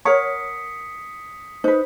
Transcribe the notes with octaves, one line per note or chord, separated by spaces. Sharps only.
A#4 C#5 F#5 A#5 D#6 B6 C#7
D#4 B4 C5